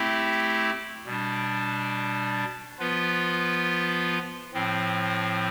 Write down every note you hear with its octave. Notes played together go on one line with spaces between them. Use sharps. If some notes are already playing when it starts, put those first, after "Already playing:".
Already playing: A3 C4 E4 G4
B2 G3 D4
F3 B3 F4 B4
A2 F3 C4